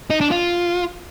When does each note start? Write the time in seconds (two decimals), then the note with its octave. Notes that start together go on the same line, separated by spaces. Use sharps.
0.10 D#4
0.21 D4
0.31 F4